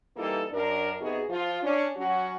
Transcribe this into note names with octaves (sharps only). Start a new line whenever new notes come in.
E3 G3 A#3 D#4 F4 A4
F#2 D4 A#4
C3 B3 D#4 F#4 G#4
F3 F4
C#4 D4
F#3 C#4 F#4